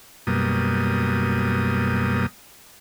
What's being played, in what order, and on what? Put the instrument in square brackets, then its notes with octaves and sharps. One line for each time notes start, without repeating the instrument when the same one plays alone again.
[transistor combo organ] F#2 B2 G3 A#3 D#6